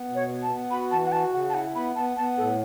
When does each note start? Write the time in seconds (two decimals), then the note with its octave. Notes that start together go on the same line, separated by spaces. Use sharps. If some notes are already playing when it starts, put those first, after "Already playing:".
Already playing: B3
0.08 B2
0.15 C#5
0.29 B3
0.43 A5
0.50 B3
0.71 F#4 B5
0.91 E3 A5
1.06 F#5
1.12 F#4 A5
1.33 C#3 F#5
1.50 A5
1.54 E4 F#5
1.75 B3 B5
1.96 B3 A5
2.17 B3 A5
2.38 A2 A4